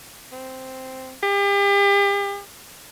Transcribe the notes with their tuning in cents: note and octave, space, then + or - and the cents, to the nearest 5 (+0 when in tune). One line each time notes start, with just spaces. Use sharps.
C4 -5
G4 +40